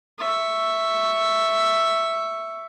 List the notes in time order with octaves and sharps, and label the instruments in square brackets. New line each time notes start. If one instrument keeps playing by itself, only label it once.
[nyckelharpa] E5 C#6